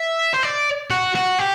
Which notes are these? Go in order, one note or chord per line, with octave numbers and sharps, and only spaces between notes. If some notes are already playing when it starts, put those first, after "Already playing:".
Already playing: E5
C5
D5
F#4
F#4
G4